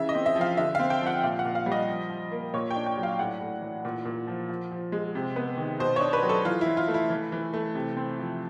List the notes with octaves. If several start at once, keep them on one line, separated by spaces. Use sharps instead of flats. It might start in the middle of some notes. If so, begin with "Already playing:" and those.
Already playing: C#3 E3 E5
D#5
C4
E5
F3
F5
D3 E5
C4 F5
G5
F3
F#5
A#2 F5
F#5
A#2
F5
G3
D#5
F3
F3
A#3
A#2 C#5
G5
D4
G5
F#3
F5
A2 F#5
A2
E3
A#2
A#2
F3
F3
F3
G#3
C3
B3
D#3
B2 C5
D4 C#5
B4
F#3
A4
E3 F4
E4
E3
F4
A3
E4
E3
E3
A3
C3
C4
F3